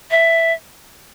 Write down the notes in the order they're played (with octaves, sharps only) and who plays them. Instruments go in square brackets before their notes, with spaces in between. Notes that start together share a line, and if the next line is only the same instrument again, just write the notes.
[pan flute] E5